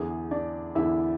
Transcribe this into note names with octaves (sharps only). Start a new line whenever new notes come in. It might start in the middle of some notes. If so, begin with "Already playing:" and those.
Already playing: E2 D3 G#4
D4 D5
E2 D3 E4 E5